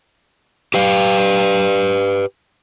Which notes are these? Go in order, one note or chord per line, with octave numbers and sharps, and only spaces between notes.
G4 B4 F5